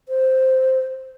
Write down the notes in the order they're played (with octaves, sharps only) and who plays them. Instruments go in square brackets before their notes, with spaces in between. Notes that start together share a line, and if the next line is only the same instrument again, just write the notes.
[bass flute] C5